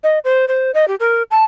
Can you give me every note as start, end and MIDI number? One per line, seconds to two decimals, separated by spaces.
0.04 0.19 75
0.25 0.45 72
0.48 0.71 72
0.74 0.88 75
0.88 0.95 67
1.00 1.23 70
1.31 1.44 81